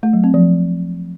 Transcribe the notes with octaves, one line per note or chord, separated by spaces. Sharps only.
A3
F#3
C4
F3